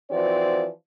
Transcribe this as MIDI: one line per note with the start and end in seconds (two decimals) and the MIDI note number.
0.11 0.67 52
0.11 0.67 53
0.11 0.67 60
0.11 0.67 66
0.11 0.67 74